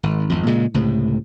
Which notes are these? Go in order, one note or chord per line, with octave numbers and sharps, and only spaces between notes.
G#1
G#1 F2
A#2 C#3 G#3
C#2 A2 C3